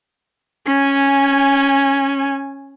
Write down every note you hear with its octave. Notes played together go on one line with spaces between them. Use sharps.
C#4 G#5